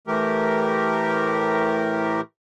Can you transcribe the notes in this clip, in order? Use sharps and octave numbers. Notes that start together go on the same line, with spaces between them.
A2 E3 A3 G4 A#4